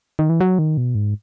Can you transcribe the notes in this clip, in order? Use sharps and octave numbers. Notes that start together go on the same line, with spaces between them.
D#3
E3
F#3
D#3
B2
G#2